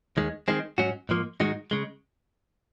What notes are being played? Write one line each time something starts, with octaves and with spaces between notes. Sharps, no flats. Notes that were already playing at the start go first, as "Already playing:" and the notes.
D#2 D#3 G#3
D#3 G#3 C4
G#2 F#3 C#4 F#4
G#2 F3 A#3
G#2 D#3 G#3 D#4 F#4
C#3 G#3